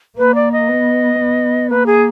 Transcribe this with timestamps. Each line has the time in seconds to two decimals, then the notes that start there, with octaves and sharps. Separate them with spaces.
0.17 A#3 B4
0.35 D5
0.52 D#5
0.68 B3
1.19 B3
1.70 A#3 B4
1.86 G#4